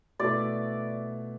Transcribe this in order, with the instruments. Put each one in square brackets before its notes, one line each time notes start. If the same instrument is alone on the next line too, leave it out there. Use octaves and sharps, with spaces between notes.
[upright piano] B2 A3 E4 B4 [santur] D5